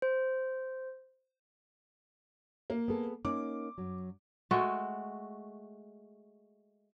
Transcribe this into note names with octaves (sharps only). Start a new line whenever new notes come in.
C5
A#3
B3 G#4 A4
A#3 C#4 D#4 D6
F#2 F#3
G#3 A3 F#4 A4